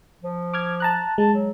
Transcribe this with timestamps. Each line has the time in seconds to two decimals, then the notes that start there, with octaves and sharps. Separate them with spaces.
0.23 F3
0.54 D6 F6 G#6
0.80 A5 A#5 F#6
1.18 G#3 A5
1.33 F#3